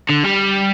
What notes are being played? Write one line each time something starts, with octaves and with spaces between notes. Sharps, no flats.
D3
G3